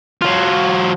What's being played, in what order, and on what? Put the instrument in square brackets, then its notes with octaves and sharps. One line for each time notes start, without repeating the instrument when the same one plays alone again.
[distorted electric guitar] F#3 F4